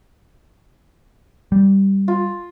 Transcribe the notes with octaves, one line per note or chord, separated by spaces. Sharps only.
G3
F4